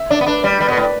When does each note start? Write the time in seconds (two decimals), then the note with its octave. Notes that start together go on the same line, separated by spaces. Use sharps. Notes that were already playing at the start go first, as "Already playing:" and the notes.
Already playing: E5
0.10 D4 D5
0.21 B3
0.26 D4 B4
0.44 G3 D5
0.60 G3 B4
0.69 B2
0.72 B4
0.77 A2
0.83 D5